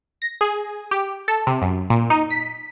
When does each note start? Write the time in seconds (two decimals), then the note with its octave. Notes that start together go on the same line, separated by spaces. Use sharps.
0.22 A#6
0.41 G#4
0.91 G4
1.28 A4
1.47 C3
1.62 F#2
1.90 A#2
2.10 D#4
2.30 B6